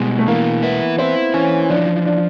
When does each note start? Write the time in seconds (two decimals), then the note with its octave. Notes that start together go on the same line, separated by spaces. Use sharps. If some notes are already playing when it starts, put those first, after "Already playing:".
Already playing: B2 G3 G#3
0.19 A3
0.28 E3 A#3
0.63 B3 E4
0.99 C4 E4
1.34 E3 C#4
1.69 F3 D4
2.05 D4